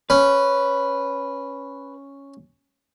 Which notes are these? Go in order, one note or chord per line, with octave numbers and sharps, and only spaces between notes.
C#4 B4